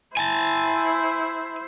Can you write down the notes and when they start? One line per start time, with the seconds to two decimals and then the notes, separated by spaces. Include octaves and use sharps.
0.17 E4 C5 G#5 A5